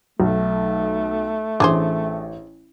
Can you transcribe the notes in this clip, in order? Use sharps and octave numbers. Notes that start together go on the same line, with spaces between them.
B1 A3
A1 D4 G#4 C5